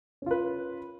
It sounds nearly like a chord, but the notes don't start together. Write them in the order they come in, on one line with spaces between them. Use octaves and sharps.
C#4 F4 B4